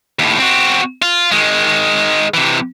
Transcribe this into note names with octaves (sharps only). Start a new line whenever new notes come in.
D#2 A2
C4 F#4
F4
D#3 G#3
C3 E3